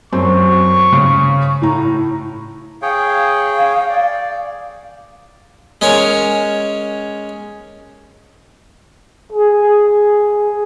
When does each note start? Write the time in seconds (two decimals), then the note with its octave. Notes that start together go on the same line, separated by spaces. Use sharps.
0.13 F#2 C4 C#6
0.92 C#3
1.62 A2 A#5
2.82 G#4 C#5 F5 G5
3.89 D5
5.81 G#3 C#4 A#4 C#5
9.32 G#4